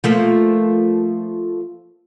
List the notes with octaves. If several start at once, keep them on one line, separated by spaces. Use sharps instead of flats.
F3 A3 A#3